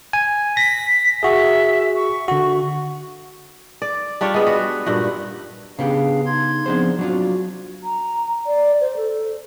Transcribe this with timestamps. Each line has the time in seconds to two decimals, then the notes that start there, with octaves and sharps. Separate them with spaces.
0.13 G#5
0.57 A#6 B6
1.23 F#4 G#4 E5
1.95 C#6
2.28 D3 F#4
3.82 D5
4.21 G3 D4 F4 C#5
4.34 G#3 B3
4.47 F#4 B4
4.86 G2 A#2 F#4
5.79 C#3 B3 D4 G4 G#4 F5
6.26 D#4 C6 G#6
6.66 F3 B3 C4 D4 G#4 C5
6.99 F#3 D4 F4 F#4
7.84 A#5
8.47 D5
8.81 C5
8.97 A4